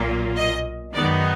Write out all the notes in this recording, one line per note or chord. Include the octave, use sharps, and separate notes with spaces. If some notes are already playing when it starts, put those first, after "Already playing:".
Already playing: B1 A#2 F#3 A#3 F4
D#5
F#2 D#3 G#3 B3 D#4 D5